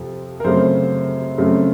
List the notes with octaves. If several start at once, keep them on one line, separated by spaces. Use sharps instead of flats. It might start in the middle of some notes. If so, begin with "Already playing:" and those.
Already playing: F2 C3 F3
A#4
F#2 C#3 A3 C4 C5
F#2 C#3 A3 C4